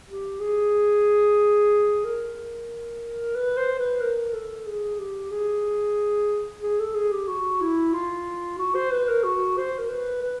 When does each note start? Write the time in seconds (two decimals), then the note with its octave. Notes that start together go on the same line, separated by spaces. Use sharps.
0.08 G4
0.40 G#4
2.04 A#4
3.35 B4
3.57 C5
3.79 B4
4.00 A#4
4.33 A4
4.66 G#4
4.99 G4
5.31 G#4
6.62 G#4
6.79 A4
6.95 G#4
7.12 G4
7.28 F#4
7.61 E4
7.93 F4
8.58 F#4
8.75 C5
8.91 B4
9.08 A#4
9.23 F#4
9.57 C5
9.79 A#4
9.89 B4
10.22 B4